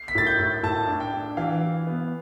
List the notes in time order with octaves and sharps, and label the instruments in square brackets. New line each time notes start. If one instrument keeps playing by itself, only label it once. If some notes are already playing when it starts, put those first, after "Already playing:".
Already playing: [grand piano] C7
B6
[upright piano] A2 [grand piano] A6
[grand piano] G6
[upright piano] A2
[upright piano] A2 [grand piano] A5
[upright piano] D4
[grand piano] G5
[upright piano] D4
[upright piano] E3 [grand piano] F5
[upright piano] E3
B3